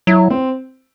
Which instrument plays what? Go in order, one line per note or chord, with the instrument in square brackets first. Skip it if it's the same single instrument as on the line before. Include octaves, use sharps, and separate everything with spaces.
[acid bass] F#3 [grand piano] E4
[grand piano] C4